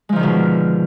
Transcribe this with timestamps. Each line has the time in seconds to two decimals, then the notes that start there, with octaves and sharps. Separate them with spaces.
0.09 G#3
0.13 F3
0.16 D#3
0.19 D3
0.23 B2